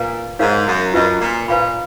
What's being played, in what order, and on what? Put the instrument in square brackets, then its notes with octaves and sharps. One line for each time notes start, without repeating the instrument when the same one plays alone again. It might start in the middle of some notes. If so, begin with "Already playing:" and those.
Already playing: [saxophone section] A#2 [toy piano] B4 F5 A#5
[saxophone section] G#2 [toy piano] D#4 A#4 C#5 F5
[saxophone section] F#2
[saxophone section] F#2 [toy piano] F4 B4 D#5
[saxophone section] A#2
[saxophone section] A#2 [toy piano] B4 F5 B5